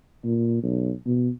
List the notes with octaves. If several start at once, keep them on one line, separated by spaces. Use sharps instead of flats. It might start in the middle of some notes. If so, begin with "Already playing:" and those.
A#2
B1
B2